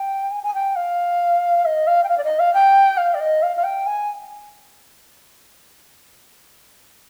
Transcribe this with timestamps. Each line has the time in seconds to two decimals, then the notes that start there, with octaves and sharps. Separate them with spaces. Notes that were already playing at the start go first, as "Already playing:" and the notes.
Already playing: G5
0.31 G#5
0.44 G#5
0.54 G5
0.76 F5
1.65 D#5
1.87 F5
2.04 G5
2.09 F5
2.18 D5
2.24 D#5
2.39 F5
2.54 G5
2.97 F5
3.14 D5
3.20 D#5
3.42 F5
3.57 F5
3.64 G5
3.86 G#5